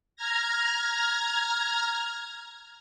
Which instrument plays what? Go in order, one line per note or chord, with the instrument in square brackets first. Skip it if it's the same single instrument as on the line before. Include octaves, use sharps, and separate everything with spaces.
[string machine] A#5 F6 G#6 A#6